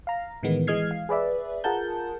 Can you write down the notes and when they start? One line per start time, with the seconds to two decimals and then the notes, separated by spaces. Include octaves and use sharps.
0.07 F5 A#5
0.43 A2 D#3 E3 G#3 B3
0.67 E3 G#3 D#5 F6 G#6 C7
0.91 F5
1.09 G#4 B4 D5 E5
1.64 F4 G#4 A#4 F#5 A5 G6